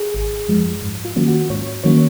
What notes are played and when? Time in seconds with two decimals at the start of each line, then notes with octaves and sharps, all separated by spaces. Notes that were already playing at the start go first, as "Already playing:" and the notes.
Already playing: G#4
0.14 G#1
0.48 F#2 F3 G#3
0.82 G#2
1.05 F4
1.16 D#3 F#3 A#3 C#4
1.27 F#4
1.50 G#2 C#5
1.83 D#3 F#3 A#3 C#4 C#5